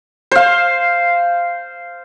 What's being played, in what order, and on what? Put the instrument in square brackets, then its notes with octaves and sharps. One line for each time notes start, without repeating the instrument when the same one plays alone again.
[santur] C5 F5